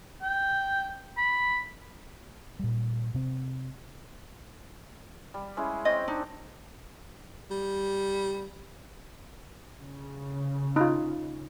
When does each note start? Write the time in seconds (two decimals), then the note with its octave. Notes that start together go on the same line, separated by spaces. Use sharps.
0.22 G5
1.17 B5
2.59 A#2 G3
3.14 C3 C4
5.34 G3
5.57 G#3 C#4 E4
5.85 C4 C#5 D#5 G5
6.08 D4 D#4
7.51 G3
9.80 C#3
10.76 D#4 F4